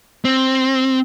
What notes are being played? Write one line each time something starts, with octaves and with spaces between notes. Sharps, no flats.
C4